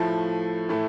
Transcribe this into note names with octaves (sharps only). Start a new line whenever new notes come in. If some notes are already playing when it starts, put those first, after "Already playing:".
Already playing: A2 F3 A3
A2 E3 A3 E4